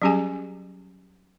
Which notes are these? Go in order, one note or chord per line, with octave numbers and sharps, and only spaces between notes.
F#3 G3 C#4 G4 G#4 G#5